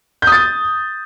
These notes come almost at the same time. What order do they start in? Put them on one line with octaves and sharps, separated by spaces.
G6 D#6 A6